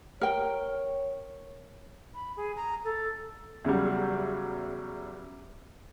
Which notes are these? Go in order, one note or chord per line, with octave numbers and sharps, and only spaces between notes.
A#4 C#5 G5
B5
G#4
A#5
A4
E2 C#3 F#3 G3